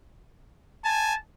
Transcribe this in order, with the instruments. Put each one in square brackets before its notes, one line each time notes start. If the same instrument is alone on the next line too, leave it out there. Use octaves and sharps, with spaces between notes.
[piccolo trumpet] G#5 [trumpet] A5